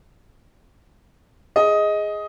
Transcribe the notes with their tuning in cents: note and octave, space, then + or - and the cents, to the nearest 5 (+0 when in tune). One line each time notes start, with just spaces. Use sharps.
G#4 +0 D#5 +10